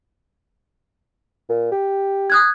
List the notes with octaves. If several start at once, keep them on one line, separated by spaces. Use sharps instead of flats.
A#2
G4
D#6 F#6 G#6